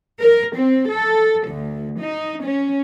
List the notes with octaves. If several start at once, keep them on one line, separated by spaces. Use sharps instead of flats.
A#4
C4
A4
D2
D#4
C#4